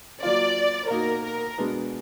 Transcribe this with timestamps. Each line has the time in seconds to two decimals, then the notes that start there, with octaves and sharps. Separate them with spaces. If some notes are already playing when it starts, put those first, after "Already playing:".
0.23 F#3 A#3 F4 D5
0.90 B2 A#3 D#4 F#4 A#4
1.24 A#4
1.58 B2 G#3 B3 D4